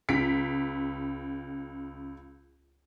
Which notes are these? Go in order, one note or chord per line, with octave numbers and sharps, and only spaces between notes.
C#2 B6 D7